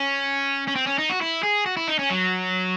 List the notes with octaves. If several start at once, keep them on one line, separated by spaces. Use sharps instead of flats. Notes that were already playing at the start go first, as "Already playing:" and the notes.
Already playing: C#4
C#4
C4
C#4
D#4
F#4
E4
G#4
F#4
E4
D#4
C#4
F#3